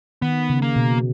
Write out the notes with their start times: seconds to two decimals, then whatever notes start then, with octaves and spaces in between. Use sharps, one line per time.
0.22 D#3 B3
0.50 C#3
0.62 A#3
0.76 B2